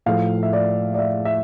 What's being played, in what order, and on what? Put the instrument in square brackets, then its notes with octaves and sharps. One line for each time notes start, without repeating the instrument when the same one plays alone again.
[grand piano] A2 F3 A3 F5
E5
D5
D5
E5
E5